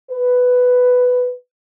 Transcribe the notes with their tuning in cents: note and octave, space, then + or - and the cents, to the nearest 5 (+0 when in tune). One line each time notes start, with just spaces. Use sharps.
B4 +5